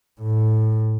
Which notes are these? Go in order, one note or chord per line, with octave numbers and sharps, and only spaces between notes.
A2